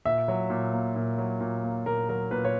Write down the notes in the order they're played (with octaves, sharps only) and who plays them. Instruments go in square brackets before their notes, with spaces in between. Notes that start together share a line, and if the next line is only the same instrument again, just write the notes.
[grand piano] A#2 E5
F#3
A#2
A#3
A#2
F#3
A#2
A#3
A#2 A#4
F#3 A#4
A#2 B4
C#5